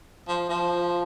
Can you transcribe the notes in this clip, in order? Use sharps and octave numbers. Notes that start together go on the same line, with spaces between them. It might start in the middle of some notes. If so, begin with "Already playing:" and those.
F3
F3